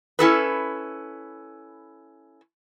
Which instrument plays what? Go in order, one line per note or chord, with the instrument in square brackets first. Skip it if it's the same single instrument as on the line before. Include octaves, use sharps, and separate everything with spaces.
[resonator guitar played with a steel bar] C#4 E4 A4 B4